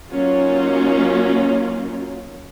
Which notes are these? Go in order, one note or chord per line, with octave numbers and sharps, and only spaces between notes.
F#3 A#3 C#4 D#4 F4